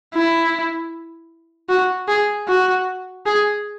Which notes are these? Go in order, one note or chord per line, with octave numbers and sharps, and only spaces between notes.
E4
F#4
G#4
F#4
G#4